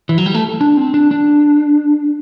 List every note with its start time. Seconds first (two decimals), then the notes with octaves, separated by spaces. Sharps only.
0.09 E3
0.18 F#3
0.26 G3
0.34 A3
0.61 D4
0.77 C4
0.94 D4
1.11 D4